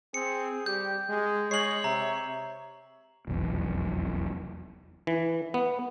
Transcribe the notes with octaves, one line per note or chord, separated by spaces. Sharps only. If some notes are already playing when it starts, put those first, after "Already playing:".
C4 G#4 C#7
G3 G4 G6
G#3 G#4
G#3 C#5 D#5 C7 F#7
C3 E5 A#5
F1 B1 E2
E3
B3